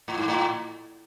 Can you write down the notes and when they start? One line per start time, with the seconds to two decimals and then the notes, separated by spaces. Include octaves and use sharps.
0.08 A2
0.18 G#2
0.28 A2